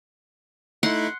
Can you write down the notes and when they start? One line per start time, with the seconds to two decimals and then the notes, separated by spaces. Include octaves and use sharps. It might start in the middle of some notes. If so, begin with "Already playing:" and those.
0.83 A3 D#4 E4 F#5 C6